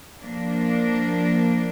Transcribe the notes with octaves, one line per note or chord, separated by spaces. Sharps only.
F3 A#3 D4